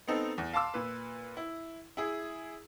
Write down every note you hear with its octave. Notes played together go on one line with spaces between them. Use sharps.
B3 C4 D#4 A4
E2
F5 A5 C6 D6 E6
A#2 B4
E4
E4 G#4